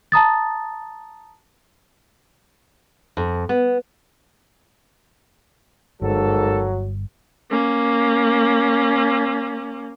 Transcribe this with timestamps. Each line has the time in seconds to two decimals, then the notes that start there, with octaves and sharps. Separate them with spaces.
0.12 A5 A#5 D#6 A6
3.17 F2
3.49 B3
6.02 G1 G#2 F#3 A#3 A4
7.51 A#3 C#4